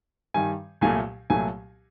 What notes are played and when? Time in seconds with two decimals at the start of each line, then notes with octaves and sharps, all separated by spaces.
0.34 G2 D#3 G3 G#5
0.81 C2 A#2 F#3 A3 G#5
1.30 C2 A#2 F#3 A3 G#5